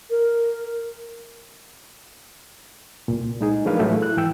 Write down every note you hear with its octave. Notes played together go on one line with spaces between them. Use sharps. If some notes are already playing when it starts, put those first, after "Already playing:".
A#4
C2 A#2
G#3 D#4 G#4
F3 A3 D4 A#4 B4 F5
A2 E3 F#3 G#3 A3
E4 F#6
G#2 E3 G5 E6